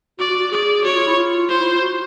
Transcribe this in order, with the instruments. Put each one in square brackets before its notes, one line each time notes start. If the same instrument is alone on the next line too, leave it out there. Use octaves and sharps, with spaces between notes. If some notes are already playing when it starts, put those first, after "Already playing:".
[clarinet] F#4 [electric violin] D5
[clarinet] F#4
F#4
[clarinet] G#4 [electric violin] D5
[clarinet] F#4 [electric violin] C#5
[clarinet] F4
E4
F4
[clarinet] F4 [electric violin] C5
[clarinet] E4
F4
F#4